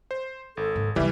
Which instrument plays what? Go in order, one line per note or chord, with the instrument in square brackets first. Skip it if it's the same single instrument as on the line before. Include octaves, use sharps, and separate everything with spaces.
[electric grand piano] C5
[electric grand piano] G#1 [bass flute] A4
[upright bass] G#2
[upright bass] C3 F#3 [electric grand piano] E3 G3 [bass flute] E5